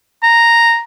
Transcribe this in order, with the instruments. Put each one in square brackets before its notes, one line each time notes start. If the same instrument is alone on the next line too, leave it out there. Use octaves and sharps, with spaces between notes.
[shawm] A#5